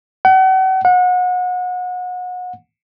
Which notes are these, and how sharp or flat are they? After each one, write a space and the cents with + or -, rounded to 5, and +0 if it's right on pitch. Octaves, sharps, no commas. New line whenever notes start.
F#5 +40
F#5 -30